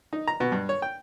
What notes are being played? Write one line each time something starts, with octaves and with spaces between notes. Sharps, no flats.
D#4
A#5
B2
G2
C#5
G5